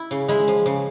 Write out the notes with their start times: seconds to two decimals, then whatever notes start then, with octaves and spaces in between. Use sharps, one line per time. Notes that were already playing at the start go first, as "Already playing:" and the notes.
Already playing: E4
0.11 C#3
0.28 G#3 E4
0.48 F3
0.66 C#3